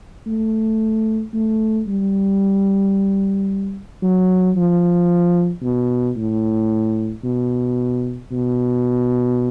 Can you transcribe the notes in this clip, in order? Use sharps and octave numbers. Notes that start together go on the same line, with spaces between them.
A3
A3
G3
F#3
F3
B2
A2
B2
B2